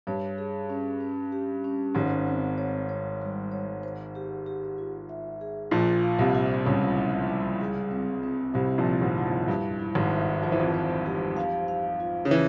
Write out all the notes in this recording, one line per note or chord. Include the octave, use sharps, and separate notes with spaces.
G2 C#5
G#4
C#4
C#4
G4
C#4
G#1 G#2 C#5
C4
C#5
C#5
G3
C#5
C5
G4
G4
F4
E5
G#4
A#1 A#2 F4
F5
C2 C3
F4
C#2 C#3 G3
E4
G3
G#4
C4
C4
C2 C3 E4
A#1 A#2
E4
G#1 G#2
E4
F2
G2 E4
E4
G#1 G#2
E5
F3 C5
E3
F2 F3
C5
G4
F5
F5
F4
C#3
E3 C5